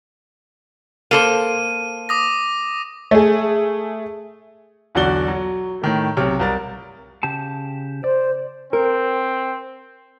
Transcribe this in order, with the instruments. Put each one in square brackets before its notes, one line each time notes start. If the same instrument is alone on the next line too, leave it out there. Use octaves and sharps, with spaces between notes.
[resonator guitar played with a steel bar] A#3 A4 C5 [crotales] D#7
[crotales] D6 D#6 A#6
[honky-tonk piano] A3 G#4
[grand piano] B1 E2 D3 F#4 D5 G7
F#3
A2 D#3 A3
B1 C3 F6
C2 A#4 A6
[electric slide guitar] C#3 G4 A5
[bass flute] C5 [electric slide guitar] D5
[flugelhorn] C4 [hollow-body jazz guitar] A#4